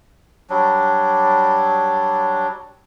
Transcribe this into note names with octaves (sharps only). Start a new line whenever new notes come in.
F#3 G3 D4